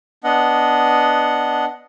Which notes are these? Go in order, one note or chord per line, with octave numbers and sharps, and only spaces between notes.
B3 D4 D#5 F#5